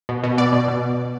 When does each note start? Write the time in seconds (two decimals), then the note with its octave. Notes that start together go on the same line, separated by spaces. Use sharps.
0.09 B2
0.24 B2
0.38 B2 D5
0.53 B2
0.68 B2